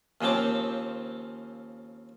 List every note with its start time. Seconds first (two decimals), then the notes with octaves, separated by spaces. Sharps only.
0.21 D#2 C#3 F3 C4 D6